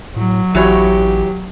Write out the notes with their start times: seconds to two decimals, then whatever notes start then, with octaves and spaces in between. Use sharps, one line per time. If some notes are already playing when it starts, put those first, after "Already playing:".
0.16 A2 F#3
0.55 A1 E3 F#4 G4 C#5